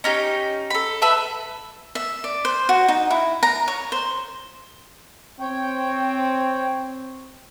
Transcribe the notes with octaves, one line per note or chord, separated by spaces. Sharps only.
C#4 D#4 G4
A4 B5
B4 E5 A5 B5
E5
D5
C5
F#4
D#4
E4
A#5
C#5
C5
C4 C#5 G5